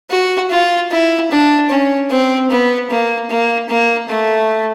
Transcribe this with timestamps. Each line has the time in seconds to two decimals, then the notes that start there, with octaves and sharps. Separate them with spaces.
0.10 F#4
0.50 F4
0.91 E4
1.31 D4
1.70 C#4
2.10 C4
2.50 B3
2.90 A#3
3.29 A#3
3.69 A#3
4.09 A3